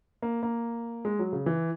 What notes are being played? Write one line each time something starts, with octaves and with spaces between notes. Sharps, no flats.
A#3
A#3
G#3
F#3
C#3
E3